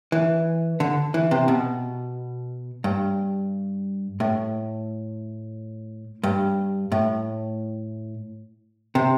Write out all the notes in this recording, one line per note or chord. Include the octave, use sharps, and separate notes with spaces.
E3
D3
E3
C3
B2
G2
A2
G2
A2
C3